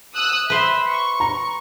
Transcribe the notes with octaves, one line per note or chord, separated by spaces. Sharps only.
D#6 E6 F#6
B4 C5 E5
C#6
A#5